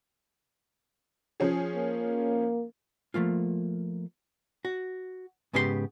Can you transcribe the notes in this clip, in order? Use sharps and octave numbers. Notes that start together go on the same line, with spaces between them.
F3 C#4 G#4
A#3
F3 A3 A#3 F4
F#4
G#2 C#3 B3 G4 B4 C6